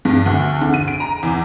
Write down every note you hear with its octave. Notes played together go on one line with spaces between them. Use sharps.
G2
D2
D3
D#7
D7
A#5
E2